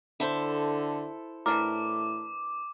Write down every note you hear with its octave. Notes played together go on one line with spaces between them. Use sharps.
D3 E4 A4 C5
A2 E3 D4 A#4 D6